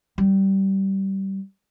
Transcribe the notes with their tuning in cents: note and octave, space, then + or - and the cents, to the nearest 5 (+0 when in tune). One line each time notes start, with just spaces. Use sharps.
G3 -20